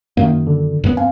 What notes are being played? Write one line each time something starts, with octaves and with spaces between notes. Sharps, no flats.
F#2 D#3 A#3
D3
F#2 B3
C4 F5 G#5